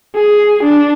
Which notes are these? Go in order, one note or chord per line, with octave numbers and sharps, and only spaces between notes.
G#4
D4